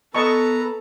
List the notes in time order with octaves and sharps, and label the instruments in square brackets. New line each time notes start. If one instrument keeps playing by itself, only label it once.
[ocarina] B3 [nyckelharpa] A4 [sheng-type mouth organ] B4 A#5 [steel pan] D#5 A5 C#6